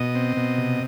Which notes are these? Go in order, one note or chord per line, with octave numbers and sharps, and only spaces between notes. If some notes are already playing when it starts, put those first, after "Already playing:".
Already playing: B2 D#5
C4
B2
C3